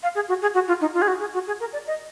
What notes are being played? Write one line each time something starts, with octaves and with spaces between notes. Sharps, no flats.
F5
G#4
F#4
G#4
F#4
F4
D#4
F4
G#4
F#4
G#4
F#4
G#4
A#4
D5
D#5